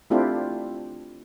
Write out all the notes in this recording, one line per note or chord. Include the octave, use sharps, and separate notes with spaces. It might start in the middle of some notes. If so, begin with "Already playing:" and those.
A3 C4 D4 E4 F4 G4